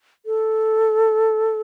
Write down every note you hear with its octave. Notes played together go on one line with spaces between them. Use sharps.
A4